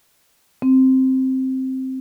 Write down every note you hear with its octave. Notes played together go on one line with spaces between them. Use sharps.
C4